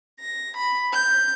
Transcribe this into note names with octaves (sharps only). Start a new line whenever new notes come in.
A#6
B5
G6